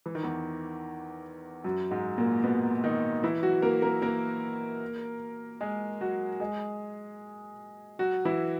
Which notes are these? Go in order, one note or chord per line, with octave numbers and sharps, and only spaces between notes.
E3
D#3
E2 E3
F#2 F#3
G#2 G#3
A#2 A#3
B2 B3
D#3 D#4
E3 E4
F#3 F#4
A#3 A#4
A#3 A#4
A#3 A#4
G#3 G#4
F#3 F#4
G#3 G#4
F#3 F#4
E3 E4